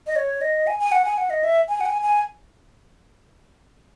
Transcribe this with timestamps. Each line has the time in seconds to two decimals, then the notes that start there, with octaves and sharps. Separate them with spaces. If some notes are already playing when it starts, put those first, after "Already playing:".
0.07 D#5
0.16 C#5
0.41 D#5
0.67 G#5
0.80 G#5
0.92 F#5
1.05 G#5
1.18 F#5
1.30 D#5
1.44 E5
1.69 G#5
1.81 F#5
1.86 G#5
2.02 G#5